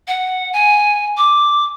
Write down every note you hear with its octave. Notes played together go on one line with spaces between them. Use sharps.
F#5
G#5
D6